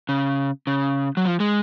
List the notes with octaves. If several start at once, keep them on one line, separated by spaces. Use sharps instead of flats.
C#3
C#3
F#3
F3
G#3